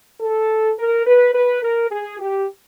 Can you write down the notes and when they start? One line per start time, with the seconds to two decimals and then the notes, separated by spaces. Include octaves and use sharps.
0.21 A4
0.78 A#4
1.06 B4
1.34 B4
1.62 A#4
1.91 G#4
2.19 G4